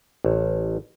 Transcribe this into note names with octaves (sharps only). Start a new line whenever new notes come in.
A1